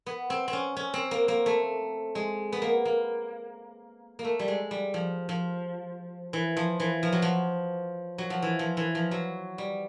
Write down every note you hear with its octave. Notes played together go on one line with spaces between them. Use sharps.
B3
C4
C4
C#4
C#4
C4
A#3
A#3
A3
G#3
B3
A#3
A#3
A#3
A3
G3
G#3
G3
F3
F3
E3
F3
E3
F3
F#3
F3
F#3
F3
E3
F3
E3
F3
F#3
G3